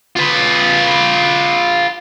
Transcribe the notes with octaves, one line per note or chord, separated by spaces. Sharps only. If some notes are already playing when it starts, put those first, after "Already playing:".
F4 B4